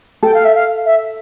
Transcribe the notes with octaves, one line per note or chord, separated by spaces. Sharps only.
A4 G5
F5
E5
F5
E5